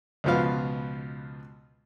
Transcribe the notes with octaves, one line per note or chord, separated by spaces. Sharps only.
C#2 B2 F3 B3 F5